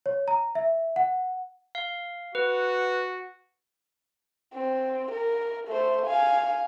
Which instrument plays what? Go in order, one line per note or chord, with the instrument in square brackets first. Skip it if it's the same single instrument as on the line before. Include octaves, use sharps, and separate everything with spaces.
[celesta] C#5
A#5
E5
F#5
[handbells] F5
[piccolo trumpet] F#4 [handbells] B4
[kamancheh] C4
A#4
A3 C5
F5 G#5